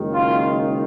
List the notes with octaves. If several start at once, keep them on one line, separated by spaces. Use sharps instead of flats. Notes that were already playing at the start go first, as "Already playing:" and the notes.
Already playing: F#1 F#2 D#3 G#3
F4